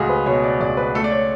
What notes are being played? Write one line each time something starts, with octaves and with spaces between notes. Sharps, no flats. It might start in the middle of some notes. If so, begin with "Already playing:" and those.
Already playing: C#2 A3 F#4 G#4
B4
B2 C#5
D5
C#2 D5
B4
A3 A4
D5
C#5